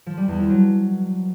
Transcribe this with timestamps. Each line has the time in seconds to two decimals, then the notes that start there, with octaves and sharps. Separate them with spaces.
0.06 F3
0.17 G3
0.28 E2
0.39 F3
0.50 F#3